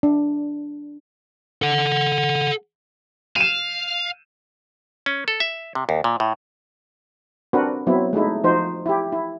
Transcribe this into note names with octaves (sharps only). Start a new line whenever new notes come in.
D4
A4 F#5
F5 D#7 E7
C#4
A4
E5
C3
D#2
A#2
A2
C4 D4 F#4 A#4 B4
F#3 B3 C4 E4
G#3 A3 D#4 E4
F3 D#4 F#4 C5
E4 G4
E4